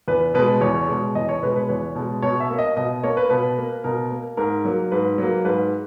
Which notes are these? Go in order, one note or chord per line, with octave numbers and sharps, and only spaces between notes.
E2 B4
B2 G#3 B4
E2 C#5
B2 G#3
E2 D#5
C#5
B2 G#3 B4
B4
E2 C#5
B2 G#3
B2 C#5
E5
A#3
D#5
B2 D#5
A#3 C#5
B4
B2 B4
A#3
B2 A#4
A#3
G#2 A#4
F#3 A#3
G#2 B4
F#3 A#3
G#2 B4